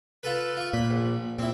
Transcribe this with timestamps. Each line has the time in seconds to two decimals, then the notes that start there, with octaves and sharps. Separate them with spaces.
0.23 F4 A4 B4
0.57 F4 C#6
0.73 A#2 B5
0.90 A#1
1.39 A#2 C4 E4